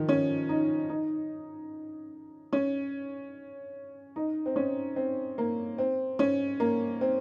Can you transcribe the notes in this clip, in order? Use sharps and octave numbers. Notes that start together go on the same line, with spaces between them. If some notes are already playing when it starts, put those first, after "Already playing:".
Already playing: D#3 F3
C#4
D#4
D#4
C#4
D#4
C4
C#4
C4
A#3
C4
C#4
A#3
C4